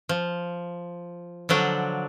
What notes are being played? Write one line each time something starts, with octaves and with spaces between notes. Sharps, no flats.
F3
D3 F3 F#3 D4